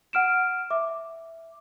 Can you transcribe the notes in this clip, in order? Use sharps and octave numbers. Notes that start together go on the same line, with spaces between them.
F#5 F6 D7 E7
E5 D6